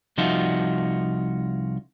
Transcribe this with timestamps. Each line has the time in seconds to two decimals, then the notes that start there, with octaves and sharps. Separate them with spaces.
0.18 C2 F3 D#4 F4 F#4 E5